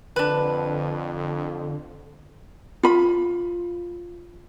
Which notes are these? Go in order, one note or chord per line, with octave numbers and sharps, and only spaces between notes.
F2 D3 D4 B4
F4 B5